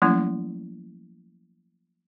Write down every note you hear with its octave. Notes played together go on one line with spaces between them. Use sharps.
F3 F#3 A3 A#3 C#4 E4